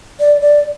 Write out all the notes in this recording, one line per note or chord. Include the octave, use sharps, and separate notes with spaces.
D5
D5